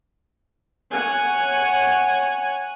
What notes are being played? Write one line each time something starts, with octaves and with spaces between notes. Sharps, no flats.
C#5 F#5 G#5